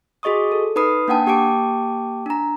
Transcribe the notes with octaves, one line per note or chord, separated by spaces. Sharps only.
F#4 G#4 D#5 C#6 D#6
A4
D#4 B4 B5 D#6 C7
A#3 D4 F#5 G5 A5
A#3 G4 G5 A5 D6 D7
D4 A#5